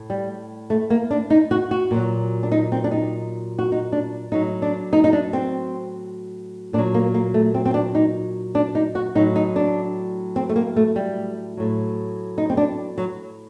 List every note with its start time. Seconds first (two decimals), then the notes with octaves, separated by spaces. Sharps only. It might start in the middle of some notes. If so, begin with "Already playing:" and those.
Already playing: A2
0.10 G3
0.70 A3
0.90 A#3
1.11 D4
1.30 D#4
1.51 F#4
1.71 F#4
1.91 A#2 F#3
2.43 D4
2.52 D#4
2.72 C4
2.84 D4
2.91 D#4
3.59 F#4
3.72 D#4
3.92 D4
4.32 A2 F#3 D#4
4.62 D4
4.93 D#4
5.04 D#4
5.13 D4
5.33 C4
6.73 A#2 D4
6.78 F#3
6.94 A#3
7.14 A#3
7.34 A3
7.54 C4
7.66 C4
7.74 D4
7.95 D#4
8.55 D4
8.75 D#4
8.95 F#4
9.15 A2 F#3 D#4
9.36 D#4
9.56 D4
10.36 C4
10.49 A3
10.56 A#3
10.76 A3
10.96 G3
11.57 A2 F#3
12.38 D#4
12.50 C4
12.57 D4
12.98 F#3